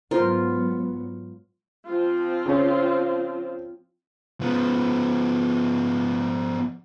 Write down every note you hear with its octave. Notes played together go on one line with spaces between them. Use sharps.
G#2 F#3 B3 F4 A#4 C5
F3 C4 F4
C#3 C#4
F3 B3